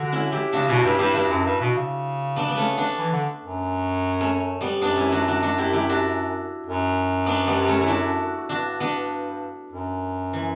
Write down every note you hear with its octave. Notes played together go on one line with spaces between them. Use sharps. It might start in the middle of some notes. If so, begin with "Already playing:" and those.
Already playing: D3 F#4
C#4 E4
E4 G4
C#3 D4 F#4
B2 C#4 E4
G2 E4 G4
G2 E4 G4
G2 D4 F#4
F#2
G2
B2
C#3
B3 D4
B3
A3 C#4
B3 D4
E3
D3
F#2
A3 C#4
G3 B3
F#2 B3 D4
C#4 E4
D4 F#4
D4 F#4
D4 F#4
E4 G4
E4 G4
D4 F#4
F#2
B3 D4
G3 B3
A3 C#4
E4
D4 F#4
G2 D4 F#4
B3 D4
F#2
E3